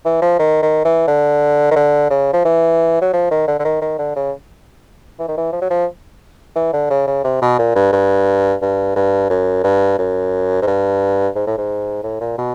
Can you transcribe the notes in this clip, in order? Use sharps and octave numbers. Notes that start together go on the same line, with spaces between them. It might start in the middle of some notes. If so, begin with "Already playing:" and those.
E3
F3
D#3
D#3
E3
D3
D#3
D3
C#3
F3
E3
F#3
F3
D#3
D3
D3
D#3
D#3
D3
C#3
E3
D#3
E3
F3
F#3
F3
E3
D3
C#3
C#3
C3
B2
A#2
G2
G2
G2
G2
F#2
G2
F#2
G#2
G2
G#2
A2
G#2
A2
A#2
B2